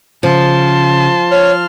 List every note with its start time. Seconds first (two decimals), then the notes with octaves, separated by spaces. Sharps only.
0.23 C#3 F3 A5 C6
1.31 C#5 F6